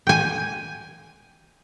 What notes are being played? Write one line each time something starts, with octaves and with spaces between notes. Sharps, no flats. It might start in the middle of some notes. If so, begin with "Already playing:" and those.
G5 G#5